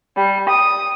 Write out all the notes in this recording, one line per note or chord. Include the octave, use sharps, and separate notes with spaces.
G3
D#6